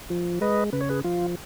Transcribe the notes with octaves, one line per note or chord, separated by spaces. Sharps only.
F3
G#3 B4 D#5
C#3 B4
C#5
G#4 B4
F3 F4